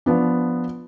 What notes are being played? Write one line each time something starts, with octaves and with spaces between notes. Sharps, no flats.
F3 B3 D4